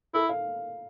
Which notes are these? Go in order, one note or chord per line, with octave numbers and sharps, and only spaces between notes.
E4 A4
F5